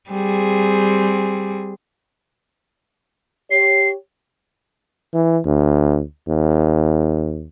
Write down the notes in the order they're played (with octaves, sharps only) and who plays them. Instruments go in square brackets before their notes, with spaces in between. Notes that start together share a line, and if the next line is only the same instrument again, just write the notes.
[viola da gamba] G3 C4 G#4
[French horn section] G4 C#5 [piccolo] C7
[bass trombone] E3
D2
D#2